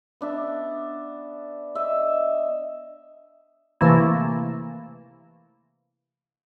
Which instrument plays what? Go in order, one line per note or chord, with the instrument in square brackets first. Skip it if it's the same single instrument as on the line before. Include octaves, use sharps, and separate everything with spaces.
[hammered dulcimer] B3 D4 E5
D#5 E5
[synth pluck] C3 E3 A3 A#3 E4